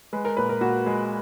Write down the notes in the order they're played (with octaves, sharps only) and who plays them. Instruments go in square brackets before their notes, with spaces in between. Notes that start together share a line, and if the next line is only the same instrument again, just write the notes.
[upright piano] G#3 B4
A#4
A#2 B4
A#4
A#2 F#4
G#3